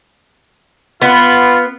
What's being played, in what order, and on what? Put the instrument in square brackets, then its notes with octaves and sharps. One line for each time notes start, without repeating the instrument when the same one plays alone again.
[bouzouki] B3 [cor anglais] F4